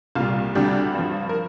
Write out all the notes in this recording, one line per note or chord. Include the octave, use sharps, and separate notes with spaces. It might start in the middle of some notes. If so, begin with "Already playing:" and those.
C2 A#2 G3 F4
D2 C3 G3 D4 G4
G2 F3
A#4